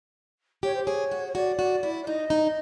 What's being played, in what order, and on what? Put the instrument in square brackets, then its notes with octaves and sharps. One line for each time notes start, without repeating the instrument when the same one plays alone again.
[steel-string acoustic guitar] G4 [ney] C#5
[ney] C5
[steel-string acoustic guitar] G#4 [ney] C#5
[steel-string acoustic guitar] F#4
[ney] C#5
[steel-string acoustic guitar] F#4 [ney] D5
[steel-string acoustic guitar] F#4
E4
[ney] D5
[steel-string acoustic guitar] D#4 [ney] D#5
[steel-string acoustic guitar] D#4